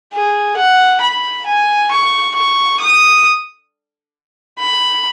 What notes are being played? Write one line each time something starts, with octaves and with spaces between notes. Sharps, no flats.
G#4
F#5
B5
G#5
C#6
C#6
D#6
B5